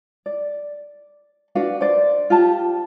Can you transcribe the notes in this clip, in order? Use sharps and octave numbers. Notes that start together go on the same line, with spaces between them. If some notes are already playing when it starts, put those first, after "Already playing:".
D5
D4 F#4 B4 F5
C5 D5
F4 G4 A5